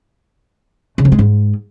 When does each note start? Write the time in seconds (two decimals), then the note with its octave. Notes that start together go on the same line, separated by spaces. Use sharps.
0.98 C#3
1.05 F2
1.12 G#3
1.19 G#2